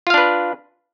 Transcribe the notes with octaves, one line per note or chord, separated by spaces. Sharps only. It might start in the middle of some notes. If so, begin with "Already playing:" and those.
D4 F4 B4 F5